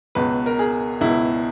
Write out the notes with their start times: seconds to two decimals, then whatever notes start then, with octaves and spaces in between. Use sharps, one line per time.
0.15 C#2 B2 B4
0.46 A#4
0.59 G#4
1.01 C#2 B2 E4